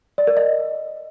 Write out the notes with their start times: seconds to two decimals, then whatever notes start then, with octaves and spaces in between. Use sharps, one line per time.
0.18 D5
0.27 A#4
0.37 D#5